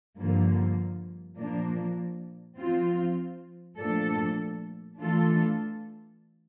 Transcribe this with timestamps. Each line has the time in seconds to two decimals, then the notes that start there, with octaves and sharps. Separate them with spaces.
0.17 G2 D3 F3 A#3
1.38 A#2 F3 A#3 D4
2.57 F3 C4 F4
3.78 A#2 F3 A3 D4 A4
4.98 E3 A3 D4 F4 A4